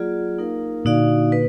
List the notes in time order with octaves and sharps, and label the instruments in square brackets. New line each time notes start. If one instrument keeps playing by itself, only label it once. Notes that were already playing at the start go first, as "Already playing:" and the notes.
Already playing: [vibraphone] F#3 A#3 F4 G#4 D5
A#3 D#4 A#4 F5
[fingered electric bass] A#2 D3 [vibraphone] D#4 F#4 D5 F5
[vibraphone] B4